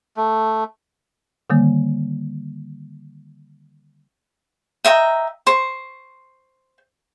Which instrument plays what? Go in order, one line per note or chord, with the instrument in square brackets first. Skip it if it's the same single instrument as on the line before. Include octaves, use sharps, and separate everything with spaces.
[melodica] A3
[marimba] D3 D#3 G3 A#3
[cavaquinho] D#5 E5 G5 A#5
C5 C#6